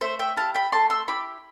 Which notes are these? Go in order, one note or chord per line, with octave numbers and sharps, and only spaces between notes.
A3 C5 E5
E5 G5
E4 G4 F5 A5
G5 B5
A3 A5 C6
C6 E6
E4 G4 B5 D6